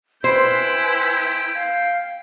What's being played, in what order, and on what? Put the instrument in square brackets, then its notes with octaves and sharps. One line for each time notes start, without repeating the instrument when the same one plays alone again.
[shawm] E4 [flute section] B4 G#5 C6 [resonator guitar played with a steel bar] C5 [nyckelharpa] G5
[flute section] F5